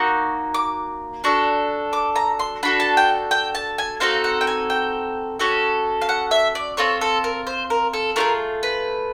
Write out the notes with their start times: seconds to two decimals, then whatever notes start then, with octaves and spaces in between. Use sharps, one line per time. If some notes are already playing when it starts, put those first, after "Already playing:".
Already playing: A#3 D#4 F#4 C#6
0.54 D6
1.24 D4 F#4 A4
1.93 D6
2.16 A#5
2.40 C6
2.63 D4 F#4 A4 B5
2.80 A5
2.97 G5
3.31 G5
3.55 A5
3.78 G#5
4.00 C4 D#4 F#4 A4 F5
4.24 F#5
4.41 G5
4.47 G#5
4.70 G5
5.39 C#4 F#4 A4
6.02 F5
6.09 F#5
6.31 E5
6.55 D5
6.77 C4 F4 A4 C#5
7.01 A4
7.24 A#4
7.47 C5
7.70 A#4
7.93 A4
8.16 A3 D4 F4 G#4 A#4
8.63 B4